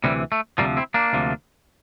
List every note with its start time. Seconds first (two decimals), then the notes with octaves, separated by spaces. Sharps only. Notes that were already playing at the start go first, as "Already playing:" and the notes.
0.04 D2 C3 E3 G3
0.32 A3
0.58 D2 C3 F3 G3 A#3
0.77 C4 E4
0.94 A#3 D4
1.13 D2 C3 F3